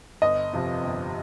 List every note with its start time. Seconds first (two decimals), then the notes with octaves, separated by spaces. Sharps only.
0.22 G1 D#5
0.53 F2 C3 F3
0.83 G1